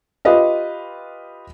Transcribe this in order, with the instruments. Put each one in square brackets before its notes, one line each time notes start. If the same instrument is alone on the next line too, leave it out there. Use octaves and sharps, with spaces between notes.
[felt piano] F4 G4 B4 D#5 F5